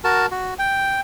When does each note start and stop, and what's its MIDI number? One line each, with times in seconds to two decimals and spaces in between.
0.04 0.26 66
0.04 0.26 70
0.04 0.26 81
0.31 0.54 66
0.59 1.01 79